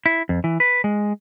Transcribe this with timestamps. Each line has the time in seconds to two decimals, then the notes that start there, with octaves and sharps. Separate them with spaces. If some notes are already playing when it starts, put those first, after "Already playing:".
0.06 E4
0.29 F2
0.44 E3
0.60 B4
0.84 G#3